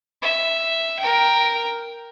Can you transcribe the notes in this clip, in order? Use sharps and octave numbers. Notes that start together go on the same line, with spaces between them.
E5
A#4 G5